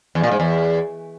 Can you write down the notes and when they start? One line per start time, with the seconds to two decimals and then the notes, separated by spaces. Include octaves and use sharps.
0.15 E2
0.23 A#2
0.31 G#2
0.40 E2